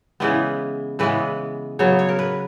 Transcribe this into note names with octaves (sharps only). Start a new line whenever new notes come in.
C#3 E3 G#3 B3 B4
C#3 E3 G#3 B3 B4
C#3 F#3 B3 C#5
C#5
A#4
B4